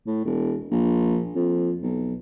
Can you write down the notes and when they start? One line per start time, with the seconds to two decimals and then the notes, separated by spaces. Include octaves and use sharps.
0.07 A2
0.25 E1
0.71 A#1
1.35 F2
1.82 B1